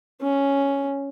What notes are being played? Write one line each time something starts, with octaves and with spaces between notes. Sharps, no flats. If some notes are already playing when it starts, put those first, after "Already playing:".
C#4